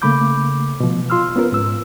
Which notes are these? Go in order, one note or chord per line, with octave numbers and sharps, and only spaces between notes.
C#3 A3 A#3 B5 D6 G6
B2 F3
F4 C6 E6 F6
B3 C#4 F4 A#4 B4
G#2 E6